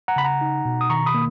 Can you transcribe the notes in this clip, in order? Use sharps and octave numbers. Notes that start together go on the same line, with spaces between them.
F#5 A#5
C#3 B5
F#5 A#5
D#4
B2
D#6
D#3 A#5 C#6
B5 D#6
A#3